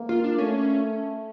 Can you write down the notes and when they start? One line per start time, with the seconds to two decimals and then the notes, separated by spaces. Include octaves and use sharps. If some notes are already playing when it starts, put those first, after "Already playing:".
Already playing: A#3
0.09 F4
0.24 D4
0.38 A3 C#4